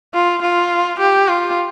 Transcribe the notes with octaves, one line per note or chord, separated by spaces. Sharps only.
F4
F4
G4
F4